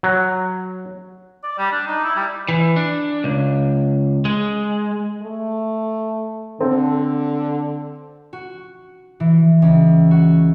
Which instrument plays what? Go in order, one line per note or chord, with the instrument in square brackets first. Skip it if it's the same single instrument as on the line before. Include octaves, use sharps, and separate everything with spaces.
[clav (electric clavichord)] F#3
[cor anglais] D5
G3
D4
D#4
E4
G3
[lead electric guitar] E3
D4
C#2
G#3
[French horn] A3
[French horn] D3 [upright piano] C4 A4
[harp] F#4
E3
C#2
F#4